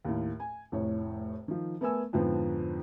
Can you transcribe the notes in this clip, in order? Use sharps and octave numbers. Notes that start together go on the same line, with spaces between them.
D#2 A2
G#5
F1 A2 C#5
D#3 F3
A3 B3 A#4 G#5 E6
F2 G#2 D3 F3 B3 C4